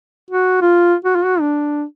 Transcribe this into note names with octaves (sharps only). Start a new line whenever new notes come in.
F#4
F4
F#4
F4
F#4
D4